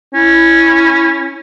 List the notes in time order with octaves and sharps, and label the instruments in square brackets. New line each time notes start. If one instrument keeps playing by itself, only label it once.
[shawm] C#4 [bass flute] E4